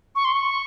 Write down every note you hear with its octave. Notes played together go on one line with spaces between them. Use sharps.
C#6
C6
C#6